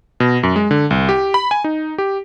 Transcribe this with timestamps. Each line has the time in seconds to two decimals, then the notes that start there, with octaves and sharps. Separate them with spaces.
0.20 B2
0.43 F#2
0.56 G#3
0.71 D3
0.90 C2
1.09 G4
1.34 B5
1.51 G#5
1.64 D#4
1.98 G4